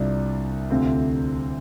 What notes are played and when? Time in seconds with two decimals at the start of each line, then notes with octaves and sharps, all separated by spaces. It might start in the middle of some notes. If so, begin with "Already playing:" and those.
Already playing: C2 C3 G3 D4 F4
0.70 D2 C3 A3 C4 F4